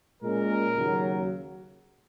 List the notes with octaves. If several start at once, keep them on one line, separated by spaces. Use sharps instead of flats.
A#2 G#3 C#4 A#4
D#2 C#3 F#3